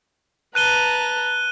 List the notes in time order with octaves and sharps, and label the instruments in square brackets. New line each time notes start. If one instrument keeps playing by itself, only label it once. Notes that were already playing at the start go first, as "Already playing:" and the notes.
[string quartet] B4 A5 A#5 [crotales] F#6 D#7 G7